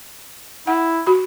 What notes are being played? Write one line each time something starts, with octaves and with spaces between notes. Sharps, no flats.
E4 F#5
F#4 B5